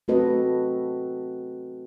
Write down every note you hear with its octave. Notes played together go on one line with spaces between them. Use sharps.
A3 C4 F#4 A4 B4 D#5